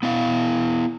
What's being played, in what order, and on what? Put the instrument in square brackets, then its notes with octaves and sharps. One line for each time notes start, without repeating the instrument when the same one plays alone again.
[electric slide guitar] B3 E4 F5